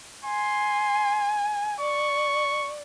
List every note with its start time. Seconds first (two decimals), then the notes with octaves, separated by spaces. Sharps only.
0.25 G#5 C6
1.80 D5 C#6